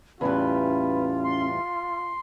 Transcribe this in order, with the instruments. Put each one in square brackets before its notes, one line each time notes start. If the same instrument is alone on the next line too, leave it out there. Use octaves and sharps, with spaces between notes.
[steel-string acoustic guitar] E2 A2 G3 [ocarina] C#4 [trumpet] F4 [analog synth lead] B4
[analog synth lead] C6